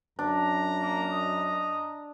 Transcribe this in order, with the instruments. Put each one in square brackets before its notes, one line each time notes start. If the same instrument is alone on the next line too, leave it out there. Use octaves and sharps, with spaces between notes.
[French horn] F#2 [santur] D4 [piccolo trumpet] A#5
[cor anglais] A#3
D#5